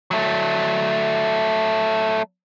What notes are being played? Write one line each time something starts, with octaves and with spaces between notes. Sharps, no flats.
F#3 A3